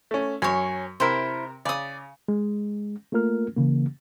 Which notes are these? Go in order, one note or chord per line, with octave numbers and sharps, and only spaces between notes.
A3 C#4
F#2 C#5 G#5
C3 E4 A#4 C5
C#3 D5 D#6
G#3
A3 A#3 F4 A#4 F6
C#3 E3 A#3